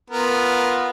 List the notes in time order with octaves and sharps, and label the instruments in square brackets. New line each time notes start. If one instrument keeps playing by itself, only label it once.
[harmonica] B3 F4 A#4